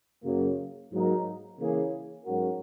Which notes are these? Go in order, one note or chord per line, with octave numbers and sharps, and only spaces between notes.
F#2 C#3 F#3 A#3
G#2 F#3 A#3 D#4 A#4
C#3 E3 A#3 C#4 G#4
G#2 F#3 C#4 F#4 A#4